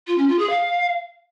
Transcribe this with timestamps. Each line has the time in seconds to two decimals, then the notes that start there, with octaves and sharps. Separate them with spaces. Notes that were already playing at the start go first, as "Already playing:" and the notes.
0.07 F4
0.18 C#4
0.28 F4
0.39 G#4
0.49 F5